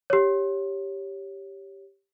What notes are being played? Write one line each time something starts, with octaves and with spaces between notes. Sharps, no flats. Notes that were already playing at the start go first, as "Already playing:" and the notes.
G4 C#5